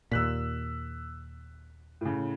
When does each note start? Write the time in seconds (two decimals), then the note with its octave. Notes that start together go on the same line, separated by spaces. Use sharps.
0.12 D#2 A#2 E6 F#6 B6
2.01 A2 C#3